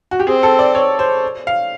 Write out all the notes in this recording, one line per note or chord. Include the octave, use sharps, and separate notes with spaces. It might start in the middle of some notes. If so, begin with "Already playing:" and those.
F#4
G4
C4 G#4
A4
D5
C#5
C5
F5